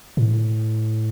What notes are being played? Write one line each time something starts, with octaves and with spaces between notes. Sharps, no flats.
A2